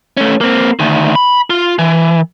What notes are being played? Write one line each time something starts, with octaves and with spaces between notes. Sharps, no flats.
A3 C#4
A#3 C4
D2 D#3
B5
F4
E3